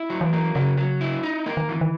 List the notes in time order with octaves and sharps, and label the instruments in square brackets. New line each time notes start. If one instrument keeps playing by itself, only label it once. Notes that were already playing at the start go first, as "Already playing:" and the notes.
Already playing: [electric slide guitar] E4
F#3
[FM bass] E3
[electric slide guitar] A#3
[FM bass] C#3 [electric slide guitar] F#3
[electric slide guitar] F#3
E4
D#4
A#3
[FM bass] D#3
[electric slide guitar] E3
[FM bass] D#3